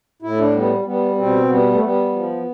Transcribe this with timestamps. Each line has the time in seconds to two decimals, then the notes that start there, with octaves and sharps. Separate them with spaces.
0.22 A2 E4
0.37 D4
0.53 G3 B3
0.85 G3 B3
1.11 B3
1.17 B2 C4
1.48 G3 B3
1.71 A3
1.80 G3 B3
2.12 F3